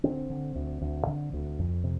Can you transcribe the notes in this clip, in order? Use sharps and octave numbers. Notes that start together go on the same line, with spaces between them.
D3 C4
D3
D2
D2
D3
D2
F2
C3